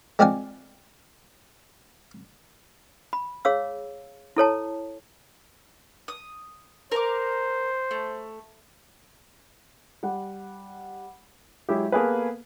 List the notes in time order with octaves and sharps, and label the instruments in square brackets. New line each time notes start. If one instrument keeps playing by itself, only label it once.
[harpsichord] G#3 C4 F4 D5 F#5 G#5
[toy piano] B5
G#4 C#5 F5 E6
E4 A4 C#5 A5
[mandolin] D#6
[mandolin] A#4 A#5 D6 [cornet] C5
[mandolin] A3
[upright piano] G3 F#5
F#3 G#3 E4 G4
A#3 B3 G#4 A4 B4